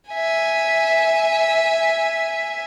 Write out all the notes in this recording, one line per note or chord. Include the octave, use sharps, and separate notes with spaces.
E5 G#5